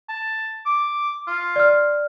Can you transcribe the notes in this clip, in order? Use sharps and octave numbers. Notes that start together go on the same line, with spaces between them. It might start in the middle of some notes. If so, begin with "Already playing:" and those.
A5
D6
F4
D5 F6